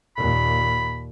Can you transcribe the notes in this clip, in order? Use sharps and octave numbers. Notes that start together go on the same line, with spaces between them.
D#2 A#2 B5